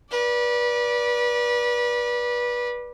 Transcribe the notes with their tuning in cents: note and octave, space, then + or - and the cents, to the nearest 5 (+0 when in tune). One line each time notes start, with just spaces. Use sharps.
B4 -30 D5 +0